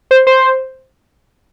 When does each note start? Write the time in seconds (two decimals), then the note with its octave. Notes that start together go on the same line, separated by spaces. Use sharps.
0.11 C5
0.27 C5